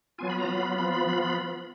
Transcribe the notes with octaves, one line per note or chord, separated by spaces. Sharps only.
F#3 B3 F4 G#5
B5
A#5
F#3 B3 F4 B5
F3 B3 F4 B5
B5
F3 B3 F4 B5
B5